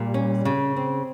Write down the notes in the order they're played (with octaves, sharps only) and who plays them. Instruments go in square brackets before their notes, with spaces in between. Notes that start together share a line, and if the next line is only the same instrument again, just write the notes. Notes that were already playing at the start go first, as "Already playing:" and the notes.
Already playing: [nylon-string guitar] A#2 [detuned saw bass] G3
[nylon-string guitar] C#4
C#3
C4